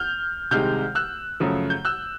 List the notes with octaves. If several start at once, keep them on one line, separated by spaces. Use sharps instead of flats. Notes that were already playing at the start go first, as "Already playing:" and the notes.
Already playing: F6 G6
C2 C3 D#3 G#3 F6 G6
E6 F#6
F#2 C#3 F3 A3
G6
E6 F#6